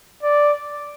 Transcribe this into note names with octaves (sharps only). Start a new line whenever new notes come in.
D5